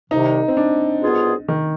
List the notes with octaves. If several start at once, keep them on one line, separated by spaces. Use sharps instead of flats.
C2 C3 D#3 D#4
C4
D4
C2 B2 B3 F4 G#4
D#3